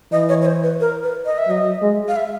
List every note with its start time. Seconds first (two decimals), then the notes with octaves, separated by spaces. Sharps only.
0.12 E3 D#5
0.29 C#5
0.42 C#5
0.46 C5
0.63 B4
0.80 A#4
1.03 B4
1.26 D#5
1.38 E5
1.48 F#3 D#5
1.82 G#3
2.08 F5
2.16 E5